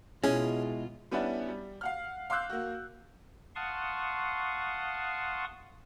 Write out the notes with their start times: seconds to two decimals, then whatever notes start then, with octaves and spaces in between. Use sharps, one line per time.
0.23 B2 G#3 C#4 E4 F4 G#4
1.11 G3 B3 C#4 D4 E4
1.48 G3
1.81 F5 F#5 F6
2.30 F5 C6 D6 E6 F#6 G6
2.49 A#3 F#4
3.56 F5 F#5 A5 C6 C#6 D#6